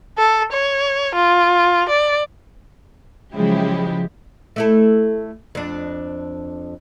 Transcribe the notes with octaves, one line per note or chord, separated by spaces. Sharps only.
A4
C#5
F4
D5
C#3 F3 F#3 G#3 E4 G4
A3 E4 A4
F2 D4